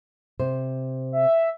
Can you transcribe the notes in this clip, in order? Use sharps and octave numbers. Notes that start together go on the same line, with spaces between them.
C3 C5
E5